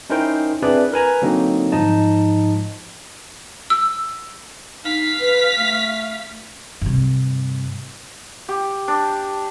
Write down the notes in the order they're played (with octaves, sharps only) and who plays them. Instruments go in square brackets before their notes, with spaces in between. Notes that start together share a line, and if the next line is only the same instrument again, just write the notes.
[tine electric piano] C#4 D#4 E4 A#4 C5 G5
C4 D4 E4 G#4 B4 D5
A#4 B4 G#5 A#5
D3 F#3 A#3 C4 D#4
G#2 F3 D#4 D#5 A5
[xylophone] E6
[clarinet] D#4 [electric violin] F5 B6
[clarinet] B4
A3
[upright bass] G2 C3
[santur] G4
D4